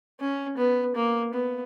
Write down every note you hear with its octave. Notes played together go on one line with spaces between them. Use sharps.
C#4
B3
A#3
B3